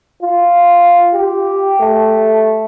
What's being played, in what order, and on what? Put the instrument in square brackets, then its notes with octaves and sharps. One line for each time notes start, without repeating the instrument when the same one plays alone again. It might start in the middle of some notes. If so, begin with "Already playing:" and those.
[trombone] F4
G4
A3